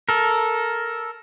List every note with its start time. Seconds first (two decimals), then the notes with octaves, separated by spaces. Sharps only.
0.09 A4 A#4